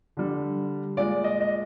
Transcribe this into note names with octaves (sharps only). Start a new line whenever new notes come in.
D3 G3
A#2 G#3 D5
D#5
D#5